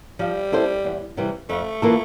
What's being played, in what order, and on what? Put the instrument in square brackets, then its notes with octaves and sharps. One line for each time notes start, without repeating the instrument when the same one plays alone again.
[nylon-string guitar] F3 [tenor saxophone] G3
[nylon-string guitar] C4 E4 A4 C5
E2
C3 E3 G3
[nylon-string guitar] F2 [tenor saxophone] A3
[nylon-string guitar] E3 A#3 F4 A4